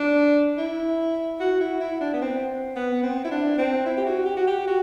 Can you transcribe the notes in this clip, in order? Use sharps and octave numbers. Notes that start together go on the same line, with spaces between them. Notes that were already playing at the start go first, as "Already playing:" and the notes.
Already playing: D4
E4
F#4
E4
E4
D4
B3
C4
B3
C4
E4
D4
C4
E4
G4
F#4
G4
F#4
G4
F#4